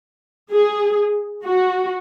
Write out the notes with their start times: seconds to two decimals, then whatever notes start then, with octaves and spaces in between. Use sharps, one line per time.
0.52 G#4
1.46 F#4